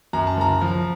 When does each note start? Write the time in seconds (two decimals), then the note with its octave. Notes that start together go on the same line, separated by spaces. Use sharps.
0.13 F#2 A#5
0.27 A5
0.37 F#1 A#5
0.61 F3